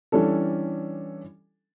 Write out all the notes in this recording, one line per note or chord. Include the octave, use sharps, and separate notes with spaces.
E3 G3 C#4 D4 A4